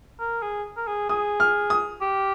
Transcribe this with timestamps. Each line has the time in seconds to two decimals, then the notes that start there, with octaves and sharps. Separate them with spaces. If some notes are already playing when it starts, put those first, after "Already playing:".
0.19 A#4
0.42 G#4
0.77 A#4
0.87 G#4
1.09 G#4 D#6
1.40 F6
1.70 D#6
2.01 G4